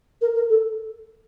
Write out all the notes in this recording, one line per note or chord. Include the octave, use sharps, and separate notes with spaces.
A#4
A#4
A4